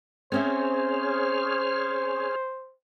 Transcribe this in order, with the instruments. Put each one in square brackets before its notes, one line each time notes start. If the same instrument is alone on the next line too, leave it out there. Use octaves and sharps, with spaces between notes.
[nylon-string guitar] C4 C#4 E5 [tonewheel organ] G#4 C#5 F6 [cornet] C5